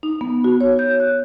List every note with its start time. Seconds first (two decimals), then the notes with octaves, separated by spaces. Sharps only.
0.03 D#4
0.21 B3
0.44 F#4
0.61 C#5
0.79 G6
1.00 F#6